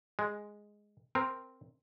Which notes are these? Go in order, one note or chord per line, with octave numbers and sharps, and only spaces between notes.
G#3
C4 A#4